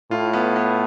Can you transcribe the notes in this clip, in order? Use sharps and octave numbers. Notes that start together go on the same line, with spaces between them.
A2 F4
B3
B3